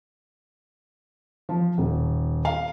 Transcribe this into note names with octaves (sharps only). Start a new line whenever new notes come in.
F3
D#1
F5